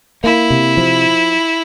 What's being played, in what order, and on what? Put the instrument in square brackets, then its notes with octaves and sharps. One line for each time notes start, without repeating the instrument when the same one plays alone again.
[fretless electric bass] A#3 [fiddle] E4
[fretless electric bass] C3
F3